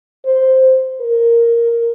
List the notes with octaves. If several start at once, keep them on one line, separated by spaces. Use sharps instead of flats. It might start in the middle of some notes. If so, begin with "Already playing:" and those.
C5
A#4